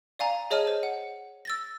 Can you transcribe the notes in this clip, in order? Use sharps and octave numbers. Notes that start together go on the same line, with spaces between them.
D5 F5 G#5 A#5
G#4 C#5 D#5 A5 F6 D#7
C5
F#5
E6 A6 A#6